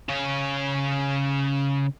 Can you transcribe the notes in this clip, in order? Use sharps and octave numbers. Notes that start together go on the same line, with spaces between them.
C#3 C#5